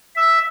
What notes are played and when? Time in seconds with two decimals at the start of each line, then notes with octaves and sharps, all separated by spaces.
0.16 E5